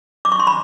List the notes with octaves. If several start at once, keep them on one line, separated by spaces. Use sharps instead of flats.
D6
C#6
C6
B5